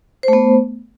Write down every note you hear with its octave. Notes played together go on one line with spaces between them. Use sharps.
A3 B3 C5